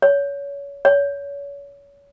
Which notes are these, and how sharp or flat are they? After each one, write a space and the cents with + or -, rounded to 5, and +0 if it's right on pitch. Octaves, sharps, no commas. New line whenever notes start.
C#5 +25
C#5 +30